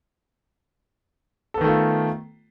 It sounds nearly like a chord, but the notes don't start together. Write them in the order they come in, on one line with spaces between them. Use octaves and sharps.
A4 B3 D#3 A3 F4